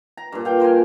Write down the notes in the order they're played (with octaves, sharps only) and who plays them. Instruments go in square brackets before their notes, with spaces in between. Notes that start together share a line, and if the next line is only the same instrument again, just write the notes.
[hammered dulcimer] A#5
G2 A#2
F5 G5
A#4 C5 D5 G#5